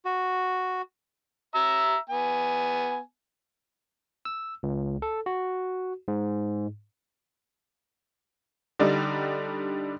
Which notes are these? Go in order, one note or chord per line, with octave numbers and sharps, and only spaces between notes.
F#4
E5 A#5 E6
B3 G#5
E6
C#2
A4
F#4
G#2
D3 G3 D4 D#4